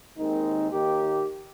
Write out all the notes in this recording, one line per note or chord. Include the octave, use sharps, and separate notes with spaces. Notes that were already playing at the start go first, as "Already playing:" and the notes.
D#2 D#3 G#3 C4 D#4
D#2 D#3 A#3 D#4 G4